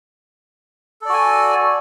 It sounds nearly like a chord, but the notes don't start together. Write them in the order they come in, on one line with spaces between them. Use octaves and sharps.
A4 D5 F#4 G#5